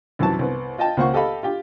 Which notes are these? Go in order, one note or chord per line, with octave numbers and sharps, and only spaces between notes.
C2 F#2 E3 F#3 A5
C2 B3
F4 D#5 G5 A5
C#2 A#3 C5 F#5 C#6
G4 A4 D#5 F5 B5
F4 G4